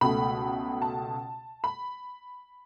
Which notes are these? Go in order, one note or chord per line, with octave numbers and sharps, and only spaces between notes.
C#2 B2 A3 B5
A5
B5